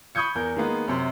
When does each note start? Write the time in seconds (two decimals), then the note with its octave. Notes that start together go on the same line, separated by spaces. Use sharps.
0.15 B5 C#6 D#6 G6 G#6 C#7
0.35 E2 A#4 G6
0.56 D#3 G#3 A#3 B3 D#4
0.88 F#2 C3